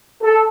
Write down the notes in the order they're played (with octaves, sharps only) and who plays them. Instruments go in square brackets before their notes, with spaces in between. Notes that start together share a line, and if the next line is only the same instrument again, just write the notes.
[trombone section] A4